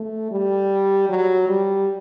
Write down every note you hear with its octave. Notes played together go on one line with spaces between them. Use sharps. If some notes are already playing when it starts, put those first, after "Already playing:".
Already playing: A3
G3
F#3
G3